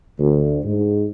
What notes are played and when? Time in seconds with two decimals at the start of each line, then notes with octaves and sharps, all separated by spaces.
0.19 D2
0.64 G#2